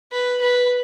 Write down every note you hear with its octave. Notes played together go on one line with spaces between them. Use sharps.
B4
B4